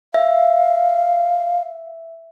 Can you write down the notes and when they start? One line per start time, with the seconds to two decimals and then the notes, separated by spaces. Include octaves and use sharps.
0.14 E5 F5